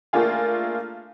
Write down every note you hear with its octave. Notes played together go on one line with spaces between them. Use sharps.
A3 A#3 D4 F4 G#4